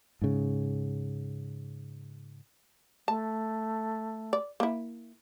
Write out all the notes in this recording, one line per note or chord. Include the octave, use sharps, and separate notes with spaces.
G#2 C#3
A3 A5
D5
A#3 E4